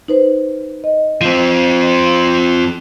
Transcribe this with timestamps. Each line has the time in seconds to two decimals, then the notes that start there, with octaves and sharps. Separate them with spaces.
0.08 D#4 B4 C5
0.84 D#5
1.21 F3 C4